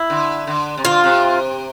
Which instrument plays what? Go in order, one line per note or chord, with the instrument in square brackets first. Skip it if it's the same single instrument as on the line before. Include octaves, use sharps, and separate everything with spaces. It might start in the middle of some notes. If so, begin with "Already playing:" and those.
Already playing: [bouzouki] E4
[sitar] D3
D3
C3
[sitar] D3 [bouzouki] F4
[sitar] C3